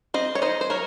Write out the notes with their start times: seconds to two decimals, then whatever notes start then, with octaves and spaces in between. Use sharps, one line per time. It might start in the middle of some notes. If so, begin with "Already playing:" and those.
0.14 C4 C5 D#5
0.35 C#5
0.42 D#4 C5 D#5
0.61 C5
0.70 F#3 A#4 C#5